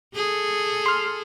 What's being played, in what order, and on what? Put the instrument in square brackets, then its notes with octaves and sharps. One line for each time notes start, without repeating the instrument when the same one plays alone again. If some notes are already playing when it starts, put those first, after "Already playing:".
[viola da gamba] G#4 A4
[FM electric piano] C6 F6